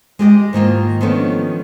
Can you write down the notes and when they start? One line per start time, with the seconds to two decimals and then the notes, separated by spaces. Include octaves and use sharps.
0.19 G#3 G4 D5 D#5
0.53 G#2 D#3 A#3 F4
1.01 D#3 F3 A3 B3 C#4 D4